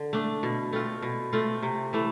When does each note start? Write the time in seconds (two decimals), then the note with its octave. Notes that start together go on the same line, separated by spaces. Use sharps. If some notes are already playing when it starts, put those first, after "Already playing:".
Already playing: D3
0.13 A3 D4
0.43 B2
0.73 A3 C4 F4
1.02 B2
1.33 A3 C4 F4
1.63 C3
1.93 E3 A3